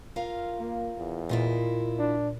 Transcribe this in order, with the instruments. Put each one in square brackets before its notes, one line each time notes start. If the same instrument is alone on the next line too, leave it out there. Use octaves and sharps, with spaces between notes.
[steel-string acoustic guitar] F4 A#4 F5
[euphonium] A#3
E2
[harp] A#2 [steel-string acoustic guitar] E4 F4 D#5
[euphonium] D4